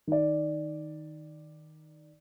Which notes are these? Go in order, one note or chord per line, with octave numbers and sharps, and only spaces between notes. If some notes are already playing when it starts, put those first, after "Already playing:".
D#3 D5